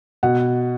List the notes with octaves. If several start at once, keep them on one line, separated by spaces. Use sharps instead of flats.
B2 F#5